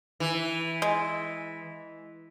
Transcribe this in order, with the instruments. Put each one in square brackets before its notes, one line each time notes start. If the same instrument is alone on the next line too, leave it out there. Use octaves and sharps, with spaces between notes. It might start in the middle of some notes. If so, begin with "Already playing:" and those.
[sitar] E3
[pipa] G#3